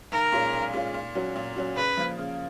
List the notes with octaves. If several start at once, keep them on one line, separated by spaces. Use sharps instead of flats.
B1 A#4
A#2 G#3 C#4 F4
B1
A#2 G#3 C#4 F4
A#2
F#3 C#4 F#4
A#2
F#3 C#4 F#4
C#3 B4
F3 A#3 F4
C#3